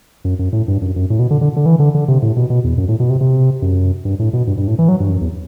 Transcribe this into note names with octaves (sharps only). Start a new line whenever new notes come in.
F#2
F#2
A2
G2
F#2
F#2
A2
B2
D3
D3
D3
E3
D3
D3
C3
A2
B2
B2
E2
F#2
A2
B2
C3
C3
F#2
G2
A2
B2
G2
G2
A2
E3
F#3
G2
F#2
E2